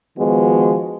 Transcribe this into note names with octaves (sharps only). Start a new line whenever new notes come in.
D#3 F3 G#3 B3 F#4